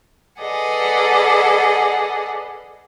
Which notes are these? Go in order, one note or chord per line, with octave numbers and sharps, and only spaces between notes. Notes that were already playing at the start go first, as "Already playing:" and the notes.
G#4 A4 B4 D5 D#5 F#5